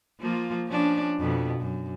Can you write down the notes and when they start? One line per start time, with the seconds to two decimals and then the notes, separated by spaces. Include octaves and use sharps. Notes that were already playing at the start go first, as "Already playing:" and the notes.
0.20 F3 A#3 F4
0.67 F3 C#4 D4
1.19 F2 B2 B3
1.61 F#2